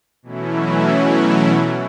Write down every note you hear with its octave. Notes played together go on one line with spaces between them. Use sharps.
B2 E3 F#3 A3 C#4 E4